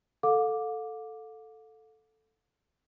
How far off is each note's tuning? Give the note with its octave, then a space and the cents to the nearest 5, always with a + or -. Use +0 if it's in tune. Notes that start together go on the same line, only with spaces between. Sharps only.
A4 +0 F5 +40 D6 +0